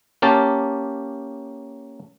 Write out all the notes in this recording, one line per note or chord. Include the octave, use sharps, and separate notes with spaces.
A#3 C#4 G4 A5